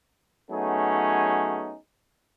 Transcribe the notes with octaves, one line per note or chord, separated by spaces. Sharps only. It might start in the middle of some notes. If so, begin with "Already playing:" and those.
F#3 A3 B3 C#4 D#4 G#4